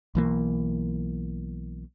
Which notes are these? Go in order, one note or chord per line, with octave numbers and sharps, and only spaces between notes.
B1 E3 A#3